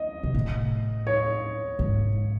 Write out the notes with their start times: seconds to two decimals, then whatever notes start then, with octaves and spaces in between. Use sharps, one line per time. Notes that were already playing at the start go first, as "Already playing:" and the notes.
Already playing: D#5
0.23 C3
0.34 A2
1.07 C#5
1.79 G#2